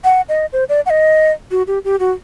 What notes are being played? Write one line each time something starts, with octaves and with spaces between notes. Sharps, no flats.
F#5
D#5
C5
D5
F#5
D#5
F#4
G4
G4
F#4